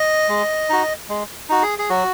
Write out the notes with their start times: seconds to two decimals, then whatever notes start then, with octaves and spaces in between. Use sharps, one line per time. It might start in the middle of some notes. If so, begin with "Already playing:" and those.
Already playing: D#5
0.29 G#3
0.69 D#4 F#4
1.09 G#3
1.49 D#4 F#4
1.63 G#4
1.79 G#4
1.89 F#3 F#4